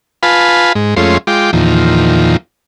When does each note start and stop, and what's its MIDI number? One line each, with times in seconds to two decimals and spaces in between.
0.23 0.73 65
0.23 0.73 71
0.23 0.73 77
0.23 0.73 80
0.23 0.73 81
0.23 0.73 83
0.76 0.94 44
0.76 0.94 56
0.97 1.18 41
0.97 1.18 56
0.97 1.18 57
0.97 1.18 61
0.97 1.18 65
0.97 1.18 84
1.27 1.51 56
1.27 1.51 65
1.27 1.51 79
1.27 1.51 86
1.53 2.37 40
1.53 2.37 46
1.53 2.37 51
1.53 2.37 53